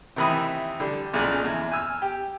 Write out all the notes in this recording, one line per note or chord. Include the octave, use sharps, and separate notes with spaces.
C3 D#3 E3 E5 B5 D#6
D3 G3
B1 A#2 C#3 D5 G#5
E2
G#5 E6 F6
G4